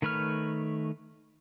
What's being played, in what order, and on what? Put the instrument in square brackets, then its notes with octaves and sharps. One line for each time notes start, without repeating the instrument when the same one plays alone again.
[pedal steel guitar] D#3 A3 B4 C#5 F6